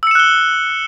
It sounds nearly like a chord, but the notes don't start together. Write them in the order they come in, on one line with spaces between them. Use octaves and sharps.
E6 C#7 E7 F#6 G7